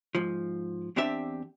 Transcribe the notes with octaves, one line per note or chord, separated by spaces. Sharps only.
G#2 F3
E2 C4 D4 G4 E5